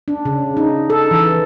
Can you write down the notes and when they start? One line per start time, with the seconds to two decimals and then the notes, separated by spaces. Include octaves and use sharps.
0.08 D4
0.25 C#3
0.57 D#4
0.90 A4
1.11 E3